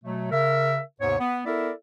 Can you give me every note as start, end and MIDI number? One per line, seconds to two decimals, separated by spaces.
0.04 0.30 47
0.04 0.30 54
0.04 0.30 57
0.31 0.80 49
0.31 0.80 70
0.31 0.80 76
1.01 1.19 39
1.01 1.19 44
1.01 1.19 48
1.01 1.19 59
1.01 1.19 73
1.19 1.41 59
1.46 1.71 59
1.46 1.71 64
1.46 1.71 69
1.46 1.71 70
1.46 1.71 74
1.46 1.71 76